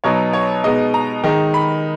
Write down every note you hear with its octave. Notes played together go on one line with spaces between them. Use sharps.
B2 F#3 B3 D#4 C#5
C#5
B2 G#3 B3 D#4 D#5
A#5
D#3 G#3 D#4
B5